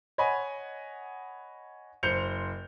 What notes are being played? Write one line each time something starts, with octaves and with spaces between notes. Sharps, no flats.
C#5 D#5 F#5 G#5 B5
F#1 C5 C6 G6 C#7 F7